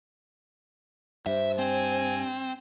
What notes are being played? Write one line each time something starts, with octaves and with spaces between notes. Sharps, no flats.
G2 C5 E5
C4 G#5